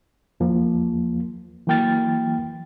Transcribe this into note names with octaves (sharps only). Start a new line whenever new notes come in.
E2 F3 A#3
E3 F#3 A#3 G5 F6 A6